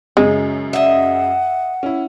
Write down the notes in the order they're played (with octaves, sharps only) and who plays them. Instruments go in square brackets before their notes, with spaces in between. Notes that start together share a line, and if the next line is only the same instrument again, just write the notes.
[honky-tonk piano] F#2 C#3 [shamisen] G#3
[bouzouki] D#5 E5 [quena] F#5
[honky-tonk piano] C#4 E4